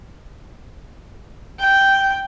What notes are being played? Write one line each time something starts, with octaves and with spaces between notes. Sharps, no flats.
G5